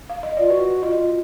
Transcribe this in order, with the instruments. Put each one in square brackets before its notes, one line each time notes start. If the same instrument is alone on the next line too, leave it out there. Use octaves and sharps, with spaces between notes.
[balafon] F5
D#5
[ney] F4 [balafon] D5
[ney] F#4 [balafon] B4
[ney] F4 [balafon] D#5